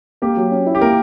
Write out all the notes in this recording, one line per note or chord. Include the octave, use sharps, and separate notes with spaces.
A#3 G4
F#3
C#4
E4
G4
A#3 A#4